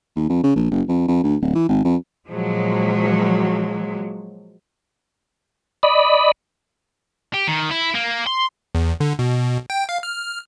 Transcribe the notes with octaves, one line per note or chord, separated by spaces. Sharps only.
D#2
F2
C#3
A#1
F#1
F2
F2
D2
D1
E3
G#1
F2
A#2 F3 F#3 G#3
D5 D#5 B5
G4
D#3
E4
A#3
C6
E2
D3
B2
G5
F5
F6